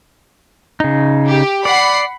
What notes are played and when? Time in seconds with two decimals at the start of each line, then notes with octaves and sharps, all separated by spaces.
0.80 C#3 D#4
1.25 G4
1.65 D5 F#5 B5 C7